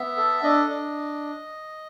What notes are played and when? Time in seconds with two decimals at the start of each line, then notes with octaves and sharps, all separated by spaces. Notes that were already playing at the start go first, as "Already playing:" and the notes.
Already playing: B3 E5
0.17 A4
0.43 D4 D#5
0.69 D4